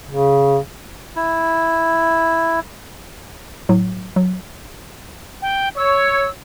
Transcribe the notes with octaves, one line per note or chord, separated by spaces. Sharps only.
C#3
E4
A2 F#3
F#3
G5
C#5 E6